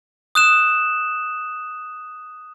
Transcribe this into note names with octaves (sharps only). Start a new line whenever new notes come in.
D#6 F#6 E7